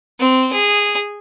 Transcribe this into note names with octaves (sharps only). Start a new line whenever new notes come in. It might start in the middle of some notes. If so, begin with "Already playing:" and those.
C4
G#4